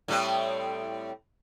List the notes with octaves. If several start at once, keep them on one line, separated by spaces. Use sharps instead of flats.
A2 G3 C4